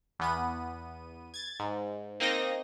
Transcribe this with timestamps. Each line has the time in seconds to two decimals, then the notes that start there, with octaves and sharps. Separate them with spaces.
0.19 E2 B3 D#7
1.34 G#6 A6
1.60 G#2
2.20 A#3 C4 D#4 D#5 A#6